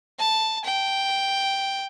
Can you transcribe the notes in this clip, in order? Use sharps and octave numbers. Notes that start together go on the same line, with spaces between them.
A5
G5